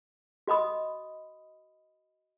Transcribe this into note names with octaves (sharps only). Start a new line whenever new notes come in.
F#4 D#5 B5 D#6